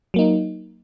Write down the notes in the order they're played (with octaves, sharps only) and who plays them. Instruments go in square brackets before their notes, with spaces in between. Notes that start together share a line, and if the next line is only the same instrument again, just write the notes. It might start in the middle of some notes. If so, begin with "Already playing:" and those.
[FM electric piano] F#3 A#3 D#4